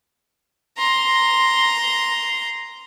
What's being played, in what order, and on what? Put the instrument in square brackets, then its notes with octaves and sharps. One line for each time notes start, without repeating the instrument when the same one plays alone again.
[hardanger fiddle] A#5 C6